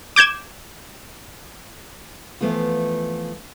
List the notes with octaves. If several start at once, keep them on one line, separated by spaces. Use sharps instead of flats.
D6 G6 G#6 E7
E3 F3 A3 B3 F4